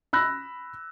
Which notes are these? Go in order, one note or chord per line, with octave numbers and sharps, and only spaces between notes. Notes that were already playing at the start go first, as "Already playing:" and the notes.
B5 E6 F#6 A#6